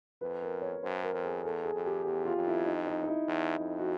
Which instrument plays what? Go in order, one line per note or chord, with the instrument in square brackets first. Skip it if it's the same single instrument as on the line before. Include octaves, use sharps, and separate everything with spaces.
[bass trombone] F2 [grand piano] B4
[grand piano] A#4
C#5
[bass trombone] F#2 [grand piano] C5
[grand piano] A#4
[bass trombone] F2
[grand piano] G#4
[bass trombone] E2 [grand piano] A4
[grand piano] G#4
[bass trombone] F2
[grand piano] G4
[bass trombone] E2 [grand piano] G4
[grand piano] F4
[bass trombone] F2
[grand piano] E4
D#4
D#4
D#4
E4
[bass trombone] E2
F2
[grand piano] F#4